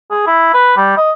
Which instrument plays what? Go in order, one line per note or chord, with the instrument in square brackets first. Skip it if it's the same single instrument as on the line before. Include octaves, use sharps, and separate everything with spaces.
[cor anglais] G#4
E4
B4
G3
D#5